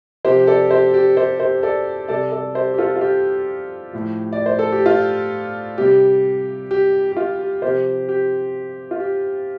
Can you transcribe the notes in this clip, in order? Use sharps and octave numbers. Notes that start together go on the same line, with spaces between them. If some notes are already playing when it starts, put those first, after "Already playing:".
C3 F3 G4 C5
A4 D5
G4 C5
G4
G4 C5
G4 C5
A4 D5
C3 G3 A4 D5
A4 D5
G4 C5
G4
F4 A4
F4
G4
A2 F3
D5
C5
A4
G4
F4
C3 G3 G4
G4
G4
F4
G4
C3 F3 G4 C5
G4
F4
G4